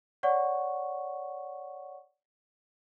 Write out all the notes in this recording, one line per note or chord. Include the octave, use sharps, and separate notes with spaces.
C#5 D5 F#5 C#6